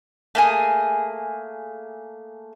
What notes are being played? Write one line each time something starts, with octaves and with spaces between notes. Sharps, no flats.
A3 A#3 G#4